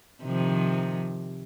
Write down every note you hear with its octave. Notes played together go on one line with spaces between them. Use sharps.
C3 D#3 F3